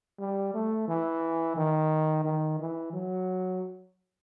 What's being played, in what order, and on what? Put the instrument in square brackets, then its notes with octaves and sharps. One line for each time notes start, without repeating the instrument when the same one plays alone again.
[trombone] G3
A3
E3
D#3
D#3
E3
F#3